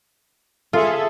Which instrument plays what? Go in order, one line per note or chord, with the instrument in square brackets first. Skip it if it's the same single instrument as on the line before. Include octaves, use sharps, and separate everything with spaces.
[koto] F4 [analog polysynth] G#4 A4 E5